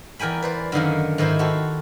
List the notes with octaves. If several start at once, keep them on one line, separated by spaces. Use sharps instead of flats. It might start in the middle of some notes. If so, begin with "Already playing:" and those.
E2 A#4 G5 G#5 B5
B4 C5 D5
F#2 D3 D#3 A#3
G#2 D#3 E4 C5 C6
F#4 G4 A4